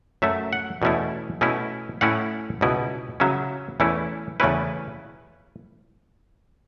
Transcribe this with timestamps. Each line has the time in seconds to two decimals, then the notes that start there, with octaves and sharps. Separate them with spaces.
0.22 F#2 F#3 A3 E5
0.53 F#5
0.82 E2 B2 A3 C#4 E4
1.41 B2 A3 C#4 E4
2.01 A2 A3 C#4 E4 F#5
2.61 C#2 B2 B3 E4
3.20 C#3 F#3 C#4 E5
3.80 E2 E3 A3 C#4 E4
4.40 E2 C#3 A3 C#4 E4 B4